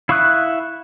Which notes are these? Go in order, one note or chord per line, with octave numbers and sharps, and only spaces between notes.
E4 F5 C#6 D#6 F#6